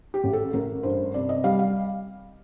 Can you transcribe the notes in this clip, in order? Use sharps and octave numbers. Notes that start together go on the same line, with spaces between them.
G4
A1
A4
A1 A#4
G2 C5
C3 D5
D#5
G3 F5
F5